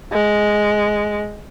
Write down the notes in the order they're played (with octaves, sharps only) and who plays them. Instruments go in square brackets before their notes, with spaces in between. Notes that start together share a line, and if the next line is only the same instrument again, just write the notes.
[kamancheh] G#3